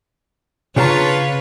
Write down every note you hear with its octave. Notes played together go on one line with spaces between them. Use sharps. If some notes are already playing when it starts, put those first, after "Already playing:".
C#3 D4 F4 B4 C#5 F#5 A#5